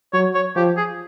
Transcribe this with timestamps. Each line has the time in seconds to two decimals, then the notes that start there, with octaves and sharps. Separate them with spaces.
0.13 F#3 C#5
0.35 C#5
0.56 F3 G4
0.77 G#4